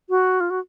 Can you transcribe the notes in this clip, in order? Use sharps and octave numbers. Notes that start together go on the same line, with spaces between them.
F#4
F4
F#4